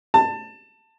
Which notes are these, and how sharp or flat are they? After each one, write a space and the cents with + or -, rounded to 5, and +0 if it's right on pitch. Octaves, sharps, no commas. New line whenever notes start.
A5 +20